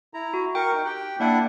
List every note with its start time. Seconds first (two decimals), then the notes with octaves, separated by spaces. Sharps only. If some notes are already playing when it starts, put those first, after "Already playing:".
0.14 E4 A#5
0.34 F#4
0.55 A#4 G5 C#6
0.74 D#4
0.86 G4 G5 F#6
1.20 A#3 D4 E4 D5 F#5 G5